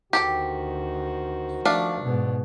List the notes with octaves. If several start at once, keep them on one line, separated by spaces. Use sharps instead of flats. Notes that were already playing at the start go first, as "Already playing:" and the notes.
D2 D#3 F#4 G4 A4 C5 G5
F3 A3 D4 F5
G#2 B2